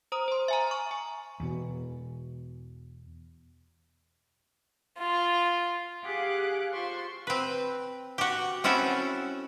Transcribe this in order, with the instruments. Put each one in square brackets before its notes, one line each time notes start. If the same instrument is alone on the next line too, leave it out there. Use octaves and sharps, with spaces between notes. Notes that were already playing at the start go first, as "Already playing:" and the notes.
[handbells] C5 A#5 D#6
C5 C6
E5 G#5 A#5
C#6
G#5
[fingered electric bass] E2 B2
[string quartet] F4
G4 G#4 F5 F#5 D6 F#6
F4 C5 C6 C#6
[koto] C4 B4
F#4 G4
C4 C#4 E4 F#4 A4